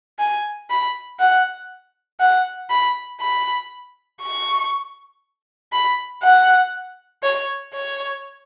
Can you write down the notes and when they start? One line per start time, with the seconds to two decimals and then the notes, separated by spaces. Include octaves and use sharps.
0.19 G#5
0.70 B5
1.20 F#5
2.20 F#5
2.70 B5
3.21 B5
4.22 C#6
5.72 B5
6.23 F#5
7.23 C#5
7.74 C#5